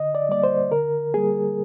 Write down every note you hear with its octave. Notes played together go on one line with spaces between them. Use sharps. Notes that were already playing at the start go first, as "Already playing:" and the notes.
Already playing: D3 D#5
D5
G3 A#3 D5
C5
D3 A#4
G3 A#3 G#4